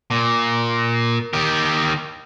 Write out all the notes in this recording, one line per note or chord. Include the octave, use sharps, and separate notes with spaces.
A#2
D#3 G4